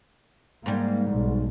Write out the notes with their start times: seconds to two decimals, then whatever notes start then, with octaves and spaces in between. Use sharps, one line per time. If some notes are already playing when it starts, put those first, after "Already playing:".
0.66 G#2 G3 A#3
1.11 B1